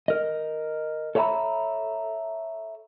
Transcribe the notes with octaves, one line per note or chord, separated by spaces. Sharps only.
A#4 D#5
A4 C#5 E5 F#5 A#5 B5